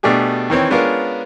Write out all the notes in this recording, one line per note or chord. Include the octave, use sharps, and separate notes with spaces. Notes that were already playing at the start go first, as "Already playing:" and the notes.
B2 A3 D4 G4 G#4
D#3 E3 C4 C#5
G#3 B3 C#4 D4 F4 A#4